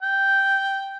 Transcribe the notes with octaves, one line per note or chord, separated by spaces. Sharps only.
G5